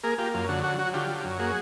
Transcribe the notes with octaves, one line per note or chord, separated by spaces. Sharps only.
A#3 G#4 A#4
A#3 F4 G4
F#2 F4
D3 F#4
F#3 F#4
F#3 F#4
D3 F4 G4
F#3
F#2
A#3 F#4 G#4